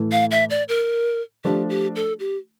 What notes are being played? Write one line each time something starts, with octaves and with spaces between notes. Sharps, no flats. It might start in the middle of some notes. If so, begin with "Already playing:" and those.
Already playing: A2 E3 A3
F5
E5
D5
A#4
F3 A3 D4 G4
G4
A4
G4